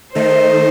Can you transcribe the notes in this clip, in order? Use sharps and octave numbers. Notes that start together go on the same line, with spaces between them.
D#3 A3 D#4 C5